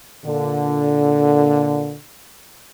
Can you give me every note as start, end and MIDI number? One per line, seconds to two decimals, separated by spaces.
0.24 1.96 46
0.24 1.96 50